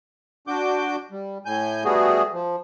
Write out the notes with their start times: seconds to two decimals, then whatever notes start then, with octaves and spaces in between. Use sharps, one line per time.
0.47 D4 F#4 D6 G6
1.11 G3
1.45 A2 G#5 G6
1.84 G3 A3 B3 F#4 G#4
2.33 F3